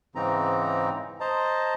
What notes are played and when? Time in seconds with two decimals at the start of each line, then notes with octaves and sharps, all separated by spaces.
0.15 G#2 C#3 E3 C4 D#4 A#5
1.20 C5 D#5 A5 A#5